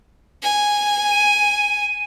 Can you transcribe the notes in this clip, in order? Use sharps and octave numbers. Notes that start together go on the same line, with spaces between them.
G#5
D#7